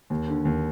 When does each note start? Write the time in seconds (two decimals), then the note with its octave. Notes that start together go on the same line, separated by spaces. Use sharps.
0.10 D#2
0.28 D3
0.45 D#2